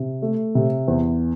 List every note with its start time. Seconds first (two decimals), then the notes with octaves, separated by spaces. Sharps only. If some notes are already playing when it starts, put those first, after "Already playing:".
Already playing: C3
0.22 A3
0.55 C3
0.88 E2